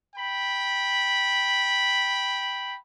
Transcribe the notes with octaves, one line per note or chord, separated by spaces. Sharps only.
G5 B5